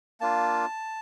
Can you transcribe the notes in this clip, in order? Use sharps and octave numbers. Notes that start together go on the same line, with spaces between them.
A#3 D4 F4 A5